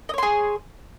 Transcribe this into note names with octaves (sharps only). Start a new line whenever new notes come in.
G#4 C#5 D#5 C6